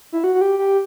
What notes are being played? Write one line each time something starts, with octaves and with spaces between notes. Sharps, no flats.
E4
F#4
F#4
G4
G4